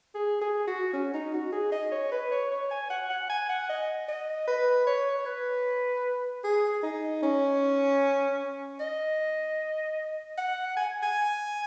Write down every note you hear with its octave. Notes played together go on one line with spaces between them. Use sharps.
G#4
G#4
F#4
C#4
D#4
F#4
G#4
D#5
C#5
B4
C#5
C#5
G#5
F#5
F#5
G#5
F#5
D#5
D#5
B4
C#5
B4
G#4
D#4
C#4
D#5
F#5
G#5
G#5